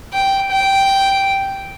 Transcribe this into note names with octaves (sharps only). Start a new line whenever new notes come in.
G5
G5